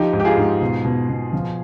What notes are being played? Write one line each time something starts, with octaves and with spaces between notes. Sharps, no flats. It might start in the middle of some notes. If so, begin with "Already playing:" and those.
Already playing: F3 D#4 G4
G#2
G4
F4 G#4
G#2
B2
B2
B2
F3